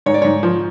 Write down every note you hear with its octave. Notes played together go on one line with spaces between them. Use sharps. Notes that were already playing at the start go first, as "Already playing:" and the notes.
G#2 C#5
D5
G#2 C#5
F3